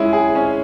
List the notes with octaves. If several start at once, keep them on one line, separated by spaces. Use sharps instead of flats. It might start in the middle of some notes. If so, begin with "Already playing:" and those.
Already playing: G#3 C#4 E4
G#4
C#4